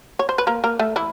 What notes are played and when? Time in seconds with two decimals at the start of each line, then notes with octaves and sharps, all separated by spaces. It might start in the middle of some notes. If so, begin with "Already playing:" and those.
0.19 C#5
0.29 C5
0.38 B4
0.47 A#3 A#4
0.64 A#3 A#4
0.79 A3 A4
0.96 E3 E4